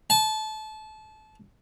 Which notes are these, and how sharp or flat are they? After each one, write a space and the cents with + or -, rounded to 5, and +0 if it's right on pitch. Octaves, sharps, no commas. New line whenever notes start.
A5 -25